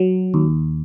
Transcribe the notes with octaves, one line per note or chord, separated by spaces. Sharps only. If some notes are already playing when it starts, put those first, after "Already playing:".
Already playing: F#3
D#2